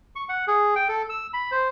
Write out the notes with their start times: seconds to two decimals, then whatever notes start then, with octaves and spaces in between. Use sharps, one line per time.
0.16 C#6
0.29 F#5
0.48 G#4
0.76 G5
0.88 A4
1.09 E6
1.33 B5
1.51 C5